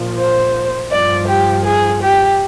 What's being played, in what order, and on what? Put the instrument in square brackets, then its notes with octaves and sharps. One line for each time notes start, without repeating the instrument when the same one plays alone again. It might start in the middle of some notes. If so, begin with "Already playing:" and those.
Already playing: [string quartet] A#2 F3
C5
G2 F3 D5
G4
G#4
G4